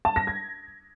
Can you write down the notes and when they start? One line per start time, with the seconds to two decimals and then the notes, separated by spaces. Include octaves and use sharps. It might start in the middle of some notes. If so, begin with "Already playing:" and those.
0.05 A5
0.16 A#6
0.27 G#6